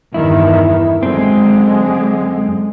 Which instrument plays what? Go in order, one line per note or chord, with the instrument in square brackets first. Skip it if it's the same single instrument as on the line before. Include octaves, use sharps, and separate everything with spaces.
[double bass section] E2 G2 D#3 [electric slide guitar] E4
[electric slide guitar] F#2 C4 [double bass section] D3 G#3